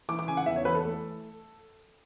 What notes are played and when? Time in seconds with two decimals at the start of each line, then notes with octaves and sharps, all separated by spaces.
0.09 E3 D6
0.19 D6
0.28 C#3 G#5
0.37 F#5
0.46 E2 E5
0.56 C#5
0.65 E3 B4
0.75 A4
0.84 A3